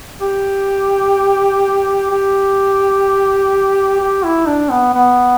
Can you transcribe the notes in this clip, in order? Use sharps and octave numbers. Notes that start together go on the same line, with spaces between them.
G4
G4
G4
E4
D4
B3
B3